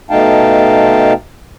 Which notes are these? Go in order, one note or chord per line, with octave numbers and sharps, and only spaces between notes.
B2 A3 D#4 F5 G5 A5